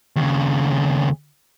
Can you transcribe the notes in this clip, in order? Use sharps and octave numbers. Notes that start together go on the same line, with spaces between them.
D#2 C#3